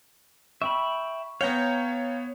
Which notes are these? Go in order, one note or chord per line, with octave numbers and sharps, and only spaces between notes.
E5 G5 B5 C#6
B3 C#5 F5 G5 A#5